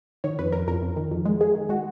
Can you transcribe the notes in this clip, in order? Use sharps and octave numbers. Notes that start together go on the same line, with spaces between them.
D#3 C#5
F2 B4
F2 A#4
F2 A#4
F2
D#3
F2
G#3
G#3 G#4
D#3
G#3 F#4